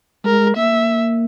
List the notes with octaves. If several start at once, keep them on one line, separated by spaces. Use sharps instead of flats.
G#3 A#4
A#3 E5